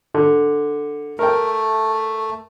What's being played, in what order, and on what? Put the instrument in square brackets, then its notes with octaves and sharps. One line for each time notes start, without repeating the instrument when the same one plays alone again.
[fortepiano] D3
[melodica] A3 [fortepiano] A#4 G5